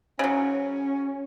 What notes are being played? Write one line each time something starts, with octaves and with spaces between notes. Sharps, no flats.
C#3 F#3 C#4